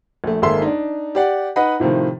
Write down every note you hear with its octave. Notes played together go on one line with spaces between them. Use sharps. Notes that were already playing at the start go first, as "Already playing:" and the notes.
A#1 A3
G#1 A#3 G#4 A4 E5 C6
D4 D#4
G4 D5 F#5
D#4 B4 D#5 F#5 B5
A2 C3 D#3 F3